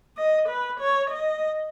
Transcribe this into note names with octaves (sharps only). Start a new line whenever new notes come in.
D#5
B4
C#5
D#5